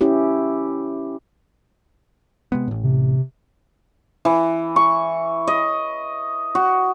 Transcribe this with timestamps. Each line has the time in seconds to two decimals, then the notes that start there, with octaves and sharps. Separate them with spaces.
0.01 C#4 E4 G4
2.52 C3 G#3 B3
2.68 A1 A2
2.84 C3
4.25 E3
4.76 C#6
5.47 D#5
6.55 F#4